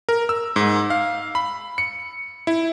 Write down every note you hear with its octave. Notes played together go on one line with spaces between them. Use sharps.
A#4
E6
G#2
F5
B5
C#7
E4